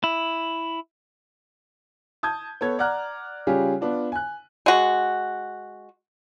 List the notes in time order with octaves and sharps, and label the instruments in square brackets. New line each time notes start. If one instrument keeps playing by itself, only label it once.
[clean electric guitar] E4
[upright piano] A5 D#6 G6 G#6
B3 A4 C#5 G#6
D5 F#5 A#5 F6 F#6
C#3 G3 C#4 F4 G4 G#4
B3 D4 F4
G#5 F#6
[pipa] G#3 F#4